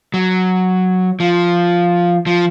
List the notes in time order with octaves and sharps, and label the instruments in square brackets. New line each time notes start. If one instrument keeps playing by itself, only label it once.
[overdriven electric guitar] F#3
F3
F3